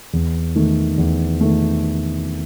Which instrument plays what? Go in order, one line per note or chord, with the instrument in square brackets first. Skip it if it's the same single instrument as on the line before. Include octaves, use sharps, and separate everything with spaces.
[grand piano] E2
D#3 A3
E2
D#3 A3